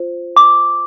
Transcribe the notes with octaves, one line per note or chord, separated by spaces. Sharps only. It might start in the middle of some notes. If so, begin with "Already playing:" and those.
Already playing: F4 C5
D6